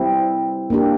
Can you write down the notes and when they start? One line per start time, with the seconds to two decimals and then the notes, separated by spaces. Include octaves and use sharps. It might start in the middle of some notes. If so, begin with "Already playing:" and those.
Already playing: G3 C4 E4
0.70 A#3 D4 G4